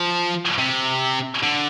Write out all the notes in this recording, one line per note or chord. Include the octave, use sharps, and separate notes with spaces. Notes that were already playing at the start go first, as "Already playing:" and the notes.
Already playing: F3
C3
D3